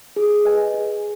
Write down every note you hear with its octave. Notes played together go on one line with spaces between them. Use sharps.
G#4
B4 D#5 G#5
G#4